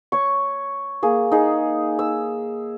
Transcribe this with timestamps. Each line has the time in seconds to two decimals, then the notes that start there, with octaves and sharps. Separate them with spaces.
0.12 C#5 C#6
1.03 A#3 G#4
1.32 D#4 G#4
1.99 E6